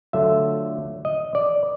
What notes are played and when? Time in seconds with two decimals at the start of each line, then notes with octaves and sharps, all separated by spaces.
0.13 D3 F#3 A3 D4 F4 E5
1.05 D#5
1.35 D5